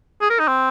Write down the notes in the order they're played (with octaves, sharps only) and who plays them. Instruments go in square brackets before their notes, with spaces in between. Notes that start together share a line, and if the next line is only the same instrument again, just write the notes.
[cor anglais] G#4
A#4
D#4
C4